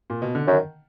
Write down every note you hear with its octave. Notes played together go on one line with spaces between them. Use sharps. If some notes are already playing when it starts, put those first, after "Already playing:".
A#2
B2
D3
F#2 D#3